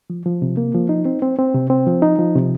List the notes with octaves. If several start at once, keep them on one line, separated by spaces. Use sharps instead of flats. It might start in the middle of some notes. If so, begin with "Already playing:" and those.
F3
F3
C3
A#3
F3
D#4
C4
C4
C4
C3
C4
F3
D#4
F3
C3